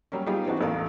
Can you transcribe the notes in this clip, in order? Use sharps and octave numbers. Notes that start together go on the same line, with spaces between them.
F#3 G3 A#3 C#4
G3 B3 D#4 F4 G4 G#4
E3 C4 D4 D#4 F#4
A1 E2 A4 A#4 F5